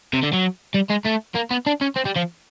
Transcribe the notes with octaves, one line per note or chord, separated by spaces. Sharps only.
C3
D3
F#3
G3
G#3
A3
A#3
B3
D4
C#4
C4
G3
F3